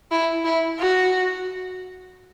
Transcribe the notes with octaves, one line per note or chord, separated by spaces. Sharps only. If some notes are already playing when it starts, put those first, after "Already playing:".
E4
E4
F#4